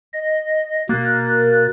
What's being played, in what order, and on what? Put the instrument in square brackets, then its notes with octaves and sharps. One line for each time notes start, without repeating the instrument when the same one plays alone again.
[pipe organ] D#5
[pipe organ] B2 F#6 A6 [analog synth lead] A#3